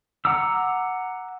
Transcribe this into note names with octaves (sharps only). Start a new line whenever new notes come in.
F#5 A#5 D6 E6